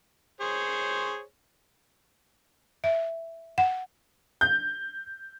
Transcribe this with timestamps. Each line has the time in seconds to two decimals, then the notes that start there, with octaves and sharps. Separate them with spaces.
0.41 G#4 C5 C#5
2.84 E5
3.58 F#5
4.41 G6